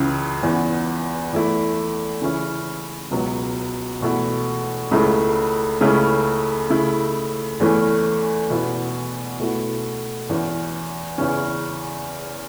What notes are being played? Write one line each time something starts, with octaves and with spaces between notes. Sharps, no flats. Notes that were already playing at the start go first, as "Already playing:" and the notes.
Already playing: C#2 C#3 E3
E2 E3 B3
E2 E3 A3 E4
C#3 E3 C#4 E4
C#2 B2 F#3 B3
E2 B2 A3 E4
C#2 C#3 A3 E4
C#2 C#3 A3 C#4 E4
C#3 A3 E4
E2 E3 A3 C#4 E4
E2 B2 B3 E4
B2 A3 E4
E2 E3 C#4
E2 C#3 E3 C#4